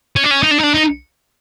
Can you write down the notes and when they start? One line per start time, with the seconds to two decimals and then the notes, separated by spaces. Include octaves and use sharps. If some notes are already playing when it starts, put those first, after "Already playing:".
0.16 C#4
0.24 D4
0.31 C#4
0.43 D#4
0.51 D4
0.58 D#4
0.63 D4
0.74 D#4